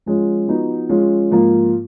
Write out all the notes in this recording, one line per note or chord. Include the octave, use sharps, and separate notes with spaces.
F3 G#3 C#4 F4
F3 B3 D#4 F#4
F3 G#3 C#4 F4
G#2 F3 A#3 F4